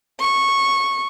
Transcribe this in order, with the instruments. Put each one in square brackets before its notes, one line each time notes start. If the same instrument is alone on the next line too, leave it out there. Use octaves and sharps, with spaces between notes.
[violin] C#6